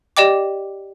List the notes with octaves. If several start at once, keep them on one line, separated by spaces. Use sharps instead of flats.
G4 D5 D#5 G5 D6